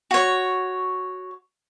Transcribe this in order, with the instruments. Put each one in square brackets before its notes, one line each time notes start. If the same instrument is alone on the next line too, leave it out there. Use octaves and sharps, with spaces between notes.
[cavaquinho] F#4 C#5